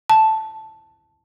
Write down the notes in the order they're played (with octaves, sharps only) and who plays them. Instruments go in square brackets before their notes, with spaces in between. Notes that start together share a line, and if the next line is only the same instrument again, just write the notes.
[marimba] A5